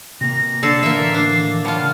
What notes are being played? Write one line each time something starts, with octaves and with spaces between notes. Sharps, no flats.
C3 A#3 A#6
D3 A4 D5 C7
A2 E3 A#3 E5
D4
G3 F4 C#5 F#5 A5
C#3 F6